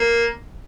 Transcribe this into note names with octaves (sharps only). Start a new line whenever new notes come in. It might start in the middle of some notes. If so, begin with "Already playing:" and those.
Already playing: A#3